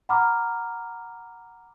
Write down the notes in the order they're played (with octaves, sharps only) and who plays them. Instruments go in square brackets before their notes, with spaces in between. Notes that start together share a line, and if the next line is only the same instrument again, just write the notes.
[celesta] F#5 A#5 B5 D6 F6